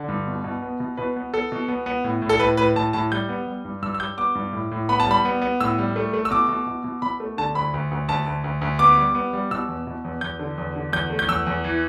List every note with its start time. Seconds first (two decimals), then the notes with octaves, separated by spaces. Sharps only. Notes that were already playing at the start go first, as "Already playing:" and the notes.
Already playing: D3
0.08 G2
0.27 B2
0.44 B2
0.62 B3
0.80 B2
0.97 B2 B4
1.16 B3
1.33 B3 A4
1.52 B2
1.68 B3
1.86 B3
2.04 A2
2.22 A2
2.29 A4
2.40 A2 B4
2.57 A2 B4
2.75 A2 A5
2.93 A2 A5
3.12 G3 G6
3.29 B3
3.47 G3
3.65 G2
3.82 G2 E6
3.95 E6
4.00 G3 G6
4.18 B3 D6
4.35 G2
4.53 A2
4.72 A2
4.89 B3 B5
5.00 A5
5.07 G3 B5
5.25 B3
5.42 B3
5.60 A2 E6
5.78 G3
5.96 A3
6.14 A3
6.25 E6
6.31 B2 D6
6.49 B2
6.67 B2
6.84 B2
7.02 B2 B5
7.20 A3
7.37 D3 A5
7.55 D2 B5
7.74 D2
7.91 D2
8.08 D2 A5
8.26 D2
8.44 D2
8.61 D2
8.79 B3 D6
8.98 G3
9.15 B3
9.33 G3
9.51 B2 E6
9.68 E2
9.87 B2
10.05 E2
10.21 E2 G6
10.39 D3
10.58 E2
10.76 D3
10.93 E2 G6
11.10 A3
11.19 G6
11.28 E2 E6
11.47 E2
11.64 E3